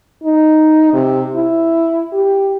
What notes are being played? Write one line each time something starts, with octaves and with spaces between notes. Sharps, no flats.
D#4
C3
E4
G4